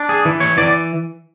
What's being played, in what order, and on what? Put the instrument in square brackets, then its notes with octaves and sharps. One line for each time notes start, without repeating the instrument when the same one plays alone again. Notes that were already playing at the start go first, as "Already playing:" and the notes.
Already playing: [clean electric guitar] D4
G#4
E3
C#5
E3 D5